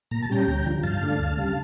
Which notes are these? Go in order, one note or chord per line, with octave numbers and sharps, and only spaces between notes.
A#2 A#5
A5
G3 C#4 G5 A#5
D2
D3 F3
G2 F5 A5
D3 A3 D4
D2
C#3 G3